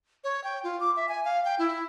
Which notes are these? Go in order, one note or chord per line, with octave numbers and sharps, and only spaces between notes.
C#5
G5
F4
D6
E5
G#5
F5
G5
E4